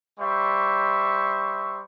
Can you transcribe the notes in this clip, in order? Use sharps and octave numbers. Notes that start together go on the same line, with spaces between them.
G3 C5 E5 C#6